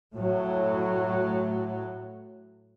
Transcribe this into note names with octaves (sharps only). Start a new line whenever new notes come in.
A2 F#3